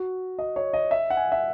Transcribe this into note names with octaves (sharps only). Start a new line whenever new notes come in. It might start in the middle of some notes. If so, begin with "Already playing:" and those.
Already playing: F#4
D#5
C#5
D#5
E5
F#5
G#5
E5